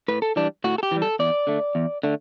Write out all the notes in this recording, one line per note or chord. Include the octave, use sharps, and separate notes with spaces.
A2 B4
A4
E3 G3 D4
A2 F#4
A4
G4
E3 G3
A4
E2 D5
D3 A3
E2
D3 A3